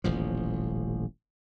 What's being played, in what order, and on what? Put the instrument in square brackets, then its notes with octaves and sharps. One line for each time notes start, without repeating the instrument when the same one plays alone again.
[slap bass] D#1 A1 F3